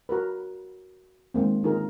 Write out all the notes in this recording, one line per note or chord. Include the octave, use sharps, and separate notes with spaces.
F#4 A#4 B4
D#3 G#3 A#3 C4
D3 D#3 D#4 F4 G#4 A#4